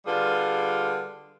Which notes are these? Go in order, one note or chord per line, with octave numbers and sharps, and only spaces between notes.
D3 G3 F4 G#4 B4